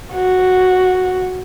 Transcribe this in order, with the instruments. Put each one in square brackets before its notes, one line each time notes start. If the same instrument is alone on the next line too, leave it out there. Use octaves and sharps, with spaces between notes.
[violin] F#4